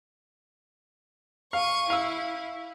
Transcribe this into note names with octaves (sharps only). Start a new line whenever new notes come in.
F5 C#6 D#7
E4 F5 E6